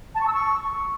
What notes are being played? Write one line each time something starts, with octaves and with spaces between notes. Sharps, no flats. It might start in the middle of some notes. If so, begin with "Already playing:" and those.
A5
C#6
E6
C#6